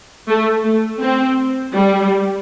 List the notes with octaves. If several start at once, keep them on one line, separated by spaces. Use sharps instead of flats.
A3
A3
C4
G3